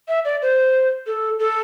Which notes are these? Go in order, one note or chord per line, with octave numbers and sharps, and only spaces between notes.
E5
D5
C5
A4
A4